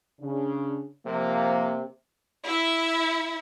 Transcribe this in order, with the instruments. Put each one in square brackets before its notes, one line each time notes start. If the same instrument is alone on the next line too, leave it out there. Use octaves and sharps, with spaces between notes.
[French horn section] C#3 D4
[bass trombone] C3 [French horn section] F3 A#3
[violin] E4 E5